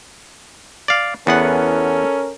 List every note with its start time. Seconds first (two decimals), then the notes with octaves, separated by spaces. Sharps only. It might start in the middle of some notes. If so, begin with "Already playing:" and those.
0.88 D5 F5
1.27 E2 B3 C#4 A4 A#4 F#5